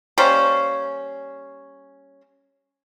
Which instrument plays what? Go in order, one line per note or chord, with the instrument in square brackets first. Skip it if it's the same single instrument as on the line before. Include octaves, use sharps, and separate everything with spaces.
[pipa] G3 A#3 C#4 C5